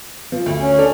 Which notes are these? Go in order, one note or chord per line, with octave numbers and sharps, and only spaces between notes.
F3
D2
C#4
D4 A4 F7